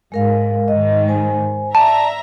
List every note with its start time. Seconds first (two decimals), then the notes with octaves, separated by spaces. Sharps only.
0.12 G#2 G#3 A#4 F5
0.68 G#2 D#3 D#5
1.08 C5 G#5
1.75 D5 E5 A5 A#5